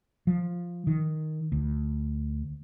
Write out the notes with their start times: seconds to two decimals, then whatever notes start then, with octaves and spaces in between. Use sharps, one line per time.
0.27 F3
0.87 D#3
1.52 D2